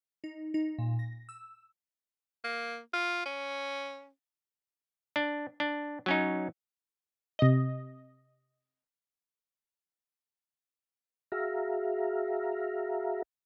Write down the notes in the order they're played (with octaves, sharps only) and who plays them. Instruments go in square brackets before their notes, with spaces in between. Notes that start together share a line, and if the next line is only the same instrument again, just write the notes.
[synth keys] D#4
D#4
A#2
A#6
E6
[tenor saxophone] A#3
F4
C#4
[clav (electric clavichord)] D4
D4
F#3 C#4 D#4
[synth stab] C3 D#5
[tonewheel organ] F#4 G#4 E5 F5 A#5